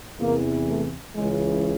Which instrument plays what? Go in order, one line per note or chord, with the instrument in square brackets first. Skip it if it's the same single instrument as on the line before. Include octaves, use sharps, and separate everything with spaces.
[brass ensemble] E2 C3 E3 A#3
A3
C#2 C#3 E3 G#3